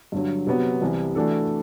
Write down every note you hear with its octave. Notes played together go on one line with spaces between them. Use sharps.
G2 D3 F#3
C3 F#3 B3 F#4
C2 C3 E3
E3 A3 D4 F#4 A4